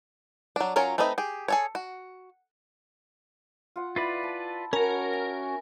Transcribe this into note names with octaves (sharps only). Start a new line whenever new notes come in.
F#3 D4
F#3 C#4 F4 A#4 C#5
A3 C4 D#4 B4 D#5
G4 G#4
G#4 A4 C#5
F#4
F4 F#5
E4 F4 B4 D5
A5
C#4 F#4 A#4
G#5